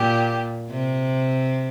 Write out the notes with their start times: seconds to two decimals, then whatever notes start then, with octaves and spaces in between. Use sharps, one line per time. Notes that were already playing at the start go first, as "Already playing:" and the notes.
Already playing: A#2 G4
0.71 C3